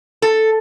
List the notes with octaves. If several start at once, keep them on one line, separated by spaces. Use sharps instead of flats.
A4